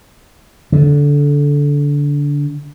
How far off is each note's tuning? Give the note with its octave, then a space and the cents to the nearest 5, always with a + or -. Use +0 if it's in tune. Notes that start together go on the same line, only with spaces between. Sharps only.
D3 -20